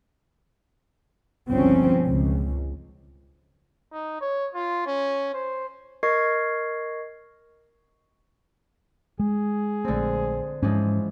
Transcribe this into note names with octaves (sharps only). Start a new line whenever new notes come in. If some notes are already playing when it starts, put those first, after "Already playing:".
G1 C#2 B2 F3 C4 C#4
C#2
D#4
C#5
F4
C#4
C5
A#4 D#5 C#6 G#6 C7
G#3 G#4
A#1 D3 A3 C4
G#2 E3 F3 G#3 C#4